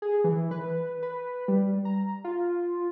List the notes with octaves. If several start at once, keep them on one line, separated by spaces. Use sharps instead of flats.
G#4
E3
B4
B4
G3
A#5
F4